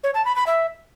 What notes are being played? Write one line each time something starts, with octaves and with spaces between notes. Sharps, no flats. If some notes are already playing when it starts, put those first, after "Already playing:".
C#5
A5
B5
B5
E5